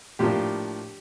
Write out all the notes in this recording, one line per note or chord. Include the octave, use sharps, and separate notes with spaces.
A2 F3 A#3 D4 G4